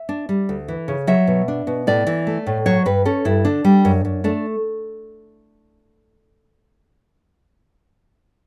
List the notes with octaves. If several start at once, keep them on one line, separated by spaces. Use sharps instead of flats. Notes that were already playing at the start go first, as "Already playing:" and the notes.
Already playing: E5
D4
G3
D2
E3
C#3
F#3 E5
B2
D4
B2
A2 D5
E3
A3
A2
F#3 C#5
G2 B4
C#4 A4
G2 E4
D3 D4
G3
F#2
F#2
A3 D4